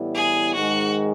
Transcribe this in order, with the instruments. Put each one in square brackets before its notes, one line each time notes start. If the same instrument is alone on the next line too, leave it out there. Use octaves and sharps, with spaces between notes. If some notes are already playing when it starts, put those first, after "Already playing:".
Already playing: [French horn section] A2 E3 G3 B3 E4
[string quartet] G#4
[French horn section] G#2 D#3 G#3 [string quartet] F#4